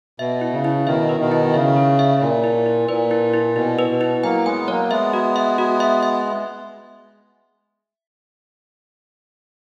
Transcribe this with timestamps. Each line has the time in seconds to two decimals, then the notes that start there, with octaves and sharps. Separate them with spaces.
0.19 B2 E5
0.41 E4
0.53 C#3
0.65 E4
0.87 B2 D#3 E5
1.09 B4
1.20 B2 D#3
1.32 E4
1.54 C#3 E5
1.76 G#4
1.99 E5
2.21 A#2 E4
2.44 E4
2.66 E4
2.89 A#2 B4
3.11 E4
3.33 E4
3.56 B2 E4
3.79 B4
3.89 B2
4.01 E4
4.23 F#3 A#3 G#5
4.46 G#3 B3 G#5
4.68 F#3 A#3 C#5
4.91 G#3 B3 E5
5.13 F#4
5.36 E5
5.58 F#4
5.80 E5
6.03 E5